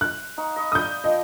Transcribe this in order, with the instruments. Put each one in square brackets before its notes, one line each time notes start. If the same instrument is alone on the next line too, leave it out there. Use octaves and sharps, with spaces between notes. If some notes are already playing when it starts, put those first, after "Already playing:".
[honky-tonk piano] F#6
[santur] D#4 F5 C#6
D#5 B5 C#6
[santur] D5 B5 [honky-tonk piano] D#6 G6
[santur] F3 D6 [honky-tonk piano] D#5